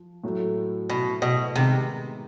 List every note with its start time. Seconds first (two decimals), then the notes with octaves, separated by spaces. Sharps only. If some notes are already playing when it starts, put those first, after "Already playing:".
Already playing: F3
0.24 A2 F#3 A3
0.90 B2
1.22 B2
1.56 C3 D#3 G#3 B3 D#4 G4